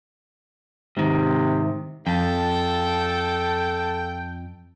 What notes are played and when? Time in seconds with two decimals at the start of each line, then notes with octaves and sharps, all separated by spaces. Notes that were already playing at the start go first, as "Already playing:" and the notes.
0.97 G#2 C3 D#3
2.07 F2 A4 G5 A5